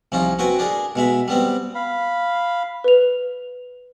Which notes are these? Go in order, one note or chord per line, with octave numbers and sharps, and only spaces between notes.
C2 F3 C#4 D#4 F4
C4 F#4 B4 G5 G#5
D4 G#4 A#4
B2 G#3 E5 B5
G3 B3 C4
F5 B5
B4 F7